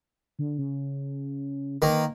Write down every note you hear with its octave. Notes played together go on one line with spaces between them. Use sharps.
D3
C#3
D#3 A#3 B4